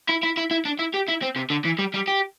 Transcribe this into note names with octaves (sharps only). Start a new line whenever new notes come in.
E4
E4
E4
E4
D4
E4
G4
E4
C4
C3
D3
E3
G3
G3
G4